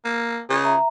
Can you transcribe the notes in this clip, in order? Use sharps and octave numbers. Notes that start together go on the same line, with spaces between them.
A#3
C#3
E5 A#5